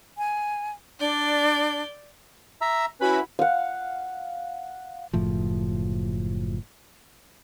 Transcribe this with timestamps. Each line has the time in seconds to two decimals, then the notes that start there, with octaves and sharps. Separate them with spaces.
0.18 G#5
1.00 D4 D5 G6
2.61 E5 A#5 E6
3.01 C#4 E4 F#4 B4 B5
3.39 F5 F#5
5.13 F#1 A2 F3